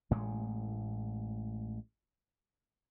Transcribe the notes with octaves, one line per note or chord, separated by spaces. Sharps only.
A1 A2 C3 G#3